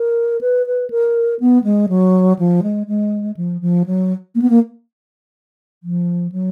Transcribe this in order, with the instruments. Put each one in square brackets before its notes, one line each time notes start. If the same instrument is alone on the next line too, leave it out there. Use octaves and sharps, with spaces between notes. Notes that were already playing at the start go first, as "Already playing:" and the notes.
Already playing: [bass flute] A#4
B4
B4
A#4
B3
G#3
F#3
F3
G#3
G#3
F3
F3
F#3
A#3
B3
A#3
F3
F#3